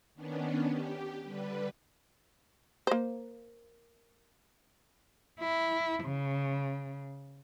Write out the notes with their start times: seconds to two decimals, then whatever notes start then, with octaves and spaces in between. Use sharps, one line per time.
0.15 D#3 B3 C#4 D4
0.67 G4
1.24 D3 G3 B4
2.87 A#3 C5
5.40 E4
6.03 C#3